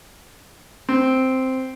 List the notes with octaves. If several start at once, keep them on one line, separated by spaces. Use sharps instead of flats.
C4